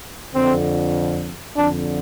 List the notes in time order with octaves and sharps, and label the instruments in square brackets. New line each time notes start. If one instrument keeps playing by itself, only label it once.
[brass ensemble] F2 D3 C4
F2 D3 D4